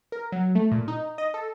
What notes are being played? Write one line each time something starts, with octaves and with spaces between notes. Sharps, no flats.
A#4
F#3
A3
A#2
D#4
D#5
A4